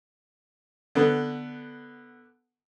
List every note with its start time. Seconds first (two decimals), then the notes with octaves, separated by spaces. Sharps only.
0.95 D3 B3